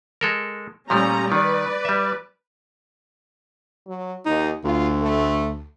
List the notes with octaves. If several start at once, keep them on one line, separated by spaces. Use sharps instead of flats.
G#3 A4 A#4
A#2 F3 G3 A3 C#4 A#5
D#3 B4 D5
G3 E5
F#3
D#2 D#4
D2 F4
A3